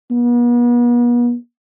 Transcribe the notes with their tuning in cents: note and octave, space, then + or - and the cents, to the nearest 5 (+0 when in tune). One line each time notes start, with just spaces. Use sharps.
B3 -40